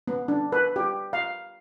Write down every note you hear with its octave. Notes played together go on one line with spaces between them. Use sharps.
B3
D4
B4
G4
F5